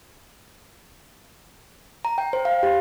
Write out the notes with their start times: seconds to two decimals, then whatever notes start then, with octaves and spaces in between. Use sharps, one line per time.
2.05 A#5
2.18 G5
2.33 C5
2.45 F5
2.63 G4